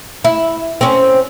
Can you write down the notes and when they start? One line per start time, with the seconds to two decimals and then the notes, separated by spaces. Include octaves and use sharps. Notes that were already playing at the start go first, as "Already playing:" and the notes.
0.25 E4
0.81 C4 C#4